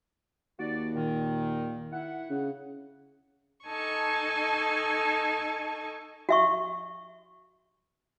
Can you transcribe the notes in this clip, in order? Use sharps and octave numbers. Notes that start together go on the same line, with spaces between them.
D#2 F#4 D5
A#2 D#3
E4 F#5
C#3
D#4 A4 G#5 A5 C#6
F#4 E5 C#6